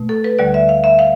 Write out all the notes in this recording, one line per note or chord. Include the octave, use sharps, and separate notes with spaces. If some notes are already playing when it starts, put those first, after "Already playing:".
Already playing: B2 A3
A4
B4
D2 D3 G3 D5
E5
F5
E5
F5